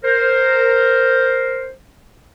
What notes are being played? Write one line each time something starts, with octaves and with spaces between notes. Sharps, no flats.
A#4 C5